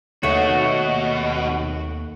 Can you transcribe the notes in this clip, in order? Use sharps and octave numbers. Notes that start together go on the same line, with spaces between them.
D#2 B2 A3 F#4 C#5